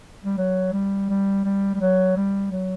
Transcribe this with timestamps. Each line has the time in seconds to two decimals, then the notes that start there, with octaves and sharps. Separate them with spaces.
0.24 G3
0.37 F#3
0.73 G3
1.09 G3
1.44 G3
1.74 G3
1.80 F#3
2.16 G3
2.51 F#3